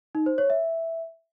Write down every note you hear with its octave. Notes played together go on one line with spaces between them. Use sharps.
D#4
C5
C#5
E5